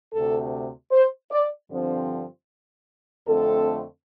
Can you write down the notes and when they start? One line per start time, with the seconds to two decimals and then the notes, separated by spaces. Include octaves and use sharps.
0.13 D2 C3 A3 A4
0.91 C5
1.31 D5
1.71 G2 D3 F3 C4
3.27 F2 D3 A3 C4 A4